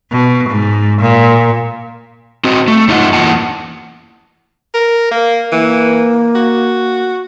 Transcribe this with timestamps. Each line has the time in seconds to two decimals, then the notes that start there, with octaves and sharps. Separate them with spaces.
0.12 B2
0.49 G#2
1.01 A#2
2.44 C4 F#4 D#5
2.68 A3
2.88 F#2 D#4 F4 D#5 E5 F#5
3.13 E2 E3 A#3 F#5 A5
4.74 A#4
5.11 A#3
5.52 E3 A#3
6.35 F#4